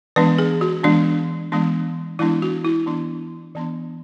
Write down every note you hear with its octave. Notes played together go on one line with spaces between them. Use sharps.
E3 G#3 B3 D4 B4
G#4
F#4
E3 G#3 B3 D4
E3 G#3 B3 D4
E3 G#3 B3 D4 E4
F#4
E4
E3 B3 D4
E3 B3 D4